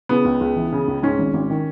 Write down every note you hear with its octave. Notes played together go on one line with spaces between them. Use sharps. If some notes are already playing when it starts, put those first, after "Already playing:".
C#3 B3
C#2
C#2
E3
C#3
C#2
G#2 C#4
G#1
G#1
D#3